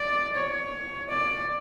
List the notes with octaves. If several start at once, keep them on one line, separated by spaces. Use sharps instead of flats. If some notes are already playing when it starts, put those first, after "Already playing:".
Already playing: D5
C#5
D5